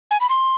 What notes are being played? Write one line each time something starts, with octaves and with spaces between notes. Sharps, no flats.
G#5
B5
C6